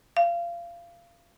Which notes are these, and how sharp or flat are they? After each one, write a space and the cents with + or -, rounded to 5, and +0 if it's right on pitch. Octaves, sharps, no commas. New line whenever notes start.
F5 -25